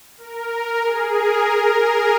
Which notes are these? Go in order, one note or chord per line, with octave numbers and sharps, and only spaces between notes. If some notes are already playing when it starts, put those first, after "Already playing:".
A#4
G#4
A#4
G#4